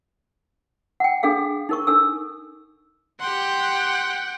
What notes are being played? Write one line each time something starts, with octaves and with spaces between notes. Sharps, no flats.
F#5 G5
D4 G#4 A4 F5
D#4 A#4 C#6
D4 A4 E6
G4 F#5 G5 C6